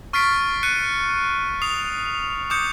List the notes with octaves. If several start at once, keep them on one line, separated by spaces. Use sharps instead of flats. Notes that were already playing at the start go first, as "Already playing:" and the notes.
C#6 F6 A6 B6 C7 D7
F#6 C#7 D#7
D#6 C7 F7
D6 D#6 G6 C#7